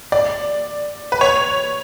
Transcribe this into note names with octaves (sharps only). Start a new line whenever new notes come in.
D5
B4
C#5